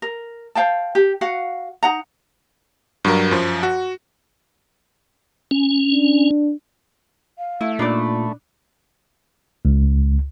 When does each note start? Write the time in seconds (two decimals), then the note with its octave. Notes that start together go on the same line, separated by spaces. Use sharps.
0.02 A#4
0.55 C5 F5 G5 A5
0.95 G4
1.21 F#4 F5 F#5
1.83 D#4 F#5 A#5
3.05 G2 F#3 A#4
3.31 F#2 F3
3.63 F#4
5.51 C#4
5.91 D4
7.38 F5
7.61 A3 E4
7.79 A#2 D4 D#4 D5 B5
9.65 C#2